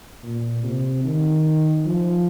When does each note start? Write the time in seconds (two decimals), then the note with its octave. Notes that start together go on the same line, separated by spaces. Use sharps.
0.23 A#2
0.63 C3
1.04 D#3
1.85 F3